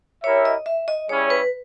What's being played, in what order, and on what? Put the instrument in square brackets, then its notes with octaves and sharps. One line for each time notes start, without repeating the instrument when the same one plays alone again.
[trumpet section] E4 G4 A#4 E5 [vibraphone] C#5
[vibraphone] D#5
E5
D#5
[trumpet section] G3 C#4 E4 G#4 [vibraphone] C#5
[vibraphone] B4